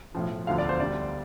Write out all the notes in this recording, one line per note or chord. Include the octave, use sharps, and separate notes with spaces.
B1 A2 F3
E1 D2 D3 F3 F5
D5
C5
D2 D3 G3 D5